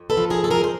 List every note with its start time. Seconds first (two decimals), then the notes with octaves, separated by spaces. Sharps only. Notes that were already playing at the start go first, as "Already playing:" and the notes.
Already playing: F2
0.10 A4 B4
0.17 F3
0.30 G#4 A#4
0.43 F2 A4
0.50 G#4 A#4
0.64 C5